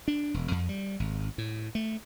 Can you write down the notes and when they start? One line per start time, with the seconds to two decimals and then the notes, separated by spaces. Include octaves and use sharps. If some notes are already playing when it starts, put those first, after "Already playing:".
0.08 D4
0.34 E1
0.51 F2
0.69 G3
1.00 G#1
1.38 A2
1.75 A3